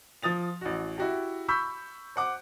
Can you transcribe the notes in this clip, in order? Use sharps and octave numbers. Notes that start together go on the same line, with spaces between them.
F3 D#6 A6 F7
A1 F#4
E4 F#4 G4
B5 C#6 E6 G6 B6
C5 F#5 D6